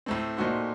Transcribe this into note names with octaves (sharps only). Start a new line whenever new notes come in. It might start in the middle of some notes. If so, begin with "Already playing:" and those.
A2 A3 C4
A#2 A3 D#4 F#4 C5